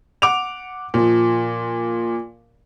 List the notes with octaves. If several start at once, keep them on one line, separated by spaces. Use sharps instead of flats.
F#5 D6 D7 F7
A#2 F3